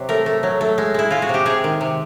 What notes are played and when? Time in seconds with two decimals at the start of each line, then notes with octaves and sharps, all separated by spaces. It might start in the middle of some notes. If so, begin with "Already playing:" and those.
Already playing: C3 F#3
0.09 A3 A#4
0.26 A3
0.43 F#3
0.61 A3
0.78 G#3
0.94 G#3 E4
1.11 G#3 F4
1.22 F#4
1.29 C3 G4
1.46 C3 G#4
1.64 D#3
1.81 C3